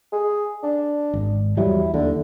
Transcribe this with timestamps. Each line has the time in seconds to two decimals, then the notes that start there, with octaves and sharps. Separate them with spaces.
0.12 G#4
0.63 D4
1.14 G#1
1.57 E2 F#3 G3 E4
1.94 D#2 D3